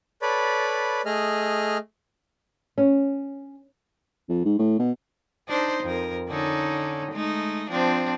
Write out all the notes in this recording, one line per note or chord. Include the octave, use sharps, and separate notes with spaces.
A4 B4 C#5 D5 B5
A3 G#4 D#5 F6
C#4
F2
G#2
A2
B2
D4 D#4 C5
F2 A#4
D3 C#4 D#4
G#3 A3 D#4
F3 C4 D4